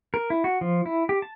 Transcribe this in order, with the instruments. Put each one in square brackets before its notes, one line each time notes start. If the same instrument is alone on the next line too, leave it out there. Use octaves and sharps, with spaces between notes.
[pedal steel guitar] A#4
E4
F#4
F3
E4
G4
A5